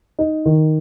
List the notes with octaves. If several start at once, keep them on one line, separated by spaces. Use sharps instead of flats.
D#4
D#3